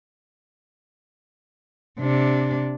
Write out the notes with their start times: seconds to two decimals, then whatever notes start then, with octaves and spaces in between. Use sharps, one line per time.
2.00 C3 D4